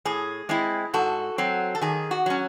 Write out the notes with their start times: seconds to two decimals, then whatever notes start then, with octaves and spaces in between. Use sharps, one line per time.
0.05 A2 G#4
0.49 G#3 C4 E4
0.94 G#2 F#4 A4
1.38 F#3 C4
1.75 A4
1.81 D#3 G#4
2.11 F#4
2.26 F#3 C#4